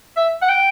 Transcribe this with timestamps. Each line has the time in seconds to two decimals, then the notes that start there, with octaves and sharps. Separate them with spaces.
0.16 E5
0.42 F#5
0.49 G5